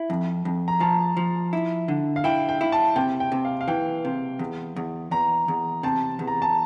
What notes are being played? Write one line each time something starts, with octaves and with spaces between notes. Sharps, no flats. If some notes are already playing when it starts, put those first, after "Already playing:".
Already playing: E4
F2
F2
A#5
F3 A5
F3
E4
D3
F5
E4 G5
G5
E4
A5
C3 G5
G5
C3
F5
F5
E3 G5
C3
E2
E2
E2 A#5
E2
C3 A5
E2
A#5
A5